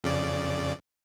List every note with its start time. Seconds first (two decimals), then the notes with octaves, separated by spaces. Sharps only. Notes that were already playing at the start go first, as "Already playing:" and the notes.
0.04 F2 C#3 D5